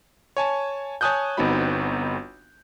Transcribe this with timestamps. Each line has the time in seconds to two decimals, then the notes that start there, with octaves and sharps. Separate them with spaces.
0.37 C#5 G#5 A5
1.01 C#5 G#5 A5 D#6 F#6 G6
1.37 G1 B3 C4 D#4 F#4 B5